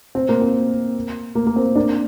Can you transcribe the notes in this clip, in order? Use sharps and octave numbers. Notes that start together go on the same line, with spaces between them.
C4
A#3
C4
A#3
A#3
C4
A#3 D4